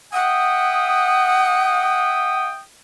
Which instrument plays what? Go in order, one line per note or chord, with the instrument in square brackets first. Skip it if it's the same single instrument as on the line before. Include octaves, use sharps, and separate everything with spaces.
[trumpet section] E5 G5 D#6 [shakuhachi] F#5